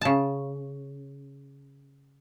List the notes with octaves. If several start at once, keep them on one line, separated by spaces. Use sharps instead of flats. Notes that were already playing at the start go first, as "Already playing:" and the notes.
C#3 A5